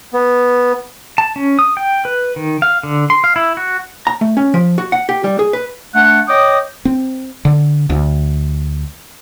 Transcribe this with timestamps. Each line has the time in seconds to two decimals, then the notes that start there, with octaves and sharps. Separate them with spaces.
0.13 B3
1.18 A5
1.36 C#4
1.59 D#6
1.77 G5
2.05 B4
2.36 D#3
2.62 F5
2.83 D3
3.10 C6
3.24 F5
3.36 E4
3.57 F#4
4.07 A#5
4.21 A3
4.37 C#4
4.54 F3
4.78 F#4
4.92 F#5
5.09 G4
5.24 G3
5.39 G#4
5.53 B4
5.94 A3 D4 F#5
6.28 C#5 D#5 G5 D6 D#6
6.85 C4
7.45 D3
7.90 D2